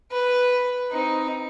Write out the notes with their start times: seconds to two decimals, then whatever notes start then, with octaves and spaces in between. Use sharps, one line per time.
0.11 B4
0.91 C4 D#4